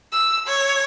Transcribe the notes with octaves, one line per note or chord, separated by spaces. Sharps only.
E6
C#5